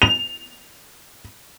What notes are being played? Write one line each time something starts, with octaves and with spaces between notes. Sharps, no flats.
F7